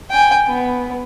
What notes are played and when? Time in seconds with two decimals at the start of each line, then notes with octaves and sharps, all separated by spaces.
0.11 G5 G#5
0.48 B3